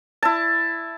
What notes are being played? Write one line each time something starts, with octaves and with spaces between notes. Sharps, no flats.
E4 A5